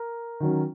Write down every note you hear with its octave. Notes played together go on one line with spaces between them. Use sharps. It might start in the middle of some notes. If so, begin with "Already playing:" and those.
Already playing: A#4
D#3 F#3 C#4